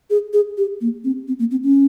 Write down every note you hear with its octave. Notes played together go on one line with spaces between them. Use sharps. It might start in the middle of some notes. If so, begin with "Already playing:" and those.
G#4
G#4
G4
A#3
C4
C4
A#3
C4
C#4